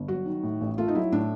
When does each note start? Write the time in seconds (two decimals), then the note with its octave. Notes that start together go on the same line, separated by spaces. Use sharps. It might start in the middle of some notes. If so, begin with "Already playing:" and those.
Already playing: G1
0.08 F#3 F#4
0.26 D#3
0.43 A2
0.61 A1
0.78 A3 F4
0.88 D#4
0.95 F#3 E4
1.12 A2 D4